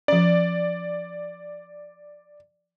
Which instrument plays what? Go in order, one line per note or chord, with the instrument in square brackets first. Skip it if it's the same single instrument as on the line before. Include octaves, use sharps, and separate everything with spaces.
[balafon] F3 C#4 [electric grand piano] D5